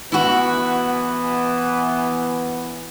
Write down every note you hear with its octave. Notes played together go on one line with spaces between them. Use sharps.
E3 B3 E4 F#4